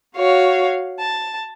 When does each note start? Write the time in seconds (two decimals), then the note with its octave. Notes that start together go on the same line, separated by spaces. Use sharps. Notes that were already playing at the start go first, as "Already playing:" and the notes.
0.16 F#4 C#5 F5
0.99 A5